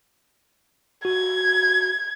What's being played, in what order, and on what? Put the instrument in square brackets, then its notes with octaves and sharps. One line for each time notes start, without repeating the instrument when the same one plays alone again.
[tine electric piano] F#4 [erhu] G#6